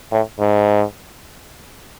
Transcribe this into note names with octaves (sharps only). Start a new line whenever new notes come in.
A2
G#2